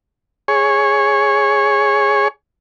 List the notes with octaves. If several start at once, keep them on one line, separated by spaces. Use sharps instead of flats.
G#4 C#5